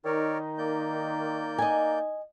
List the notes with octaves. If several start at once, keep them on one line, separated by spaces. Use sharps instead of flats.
D#3 D#4 A#4 C#5 D5
A#3 D5 G6
D#5 G#5